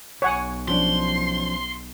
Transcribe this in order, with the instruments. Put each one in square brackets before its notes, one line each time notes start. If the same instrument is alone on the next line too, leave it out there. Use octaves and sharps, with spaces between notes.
[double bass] B1 [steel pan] C#5 F#5 G#5
[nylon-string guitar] F3 C#4 D4 [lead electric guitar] C6